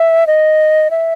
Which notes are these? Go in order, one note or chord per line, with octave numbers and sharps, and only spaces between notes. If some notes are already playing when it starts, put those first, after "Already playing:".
Already playing: E5
D#5
E5